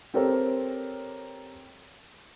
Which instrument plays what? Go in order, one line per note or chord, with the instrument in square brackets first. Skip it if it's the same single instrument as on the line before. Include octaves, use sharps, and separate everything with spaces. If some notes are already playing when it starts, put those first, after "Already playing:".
[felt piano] C4 G4 A4 A#4 C5 C#5